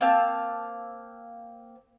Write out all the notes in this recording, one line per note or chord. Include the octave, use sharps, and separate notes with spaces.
A#3 C4 F5 A5